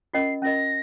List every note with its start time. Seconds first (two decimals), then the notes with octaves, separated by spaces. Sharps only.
0.13 C#4 F4 A#4 D#5 C7
0.42 C#4 F4 A#4 D#5 A#6